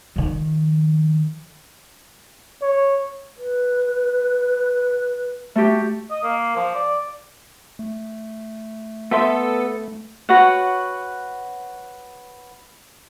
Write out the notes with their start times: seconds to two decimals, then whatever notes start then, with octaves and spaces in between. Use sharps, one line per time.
0.16 D#3 F3
2.62 C#5
3.38 B4
5.55 A3 F#4 G4
6.10 D#5
6.23 A#3
6.56 F3
6.75 D5
7.79 A3
9.11 B3 A4 E5 C6
10.29 F#4 B4 C#5 F#5